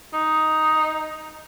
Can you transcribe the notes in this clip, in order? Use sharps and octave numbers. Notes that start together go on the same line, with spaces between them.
D#4